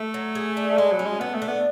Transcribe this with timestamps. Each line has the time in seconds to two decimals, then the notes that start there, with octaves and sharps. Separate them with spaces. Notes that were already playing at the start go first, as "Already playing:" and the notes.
Already playing: A3
0.14 F#3
0.35 G#4
0.57 D4
0.78 G#3 E4
0.92 F#3
0.99 C#4
1.06 G#3
1.20 B3 A4
1.34 A3
1.42 D4
1.48 B3